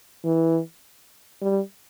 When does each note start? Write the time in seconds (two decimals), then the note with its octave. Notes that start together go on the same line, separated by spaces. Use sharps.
0.25 E3
1.42 G3